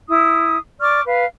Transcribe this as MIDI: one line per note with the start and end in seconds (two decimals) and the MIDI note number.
0.09 0.57 64
0.09 0.57 87
0.80 1.02 74
0.80 1.02 85
0.80 1.02 86
0.80 1.02 89
1.06 1.24 71
1.06 1.24 77